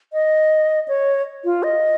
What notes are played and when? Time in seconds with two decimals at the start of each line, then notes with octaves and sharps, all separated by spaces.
0.13 D#5
0.88 C#5
1.45 F4
1.63 D#5